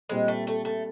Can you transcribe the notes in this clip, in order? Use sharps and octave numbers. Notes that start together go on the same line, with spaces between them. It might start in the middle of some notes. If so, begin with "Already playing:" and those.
A#2 G3 G#3 C4
A3
A3
A3